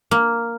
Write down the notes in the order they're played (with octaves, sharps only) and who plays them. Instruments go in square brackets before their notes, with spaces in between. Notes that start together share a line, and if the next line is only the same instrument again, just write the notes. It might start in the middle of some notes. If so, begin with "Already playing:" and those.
[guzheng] A#3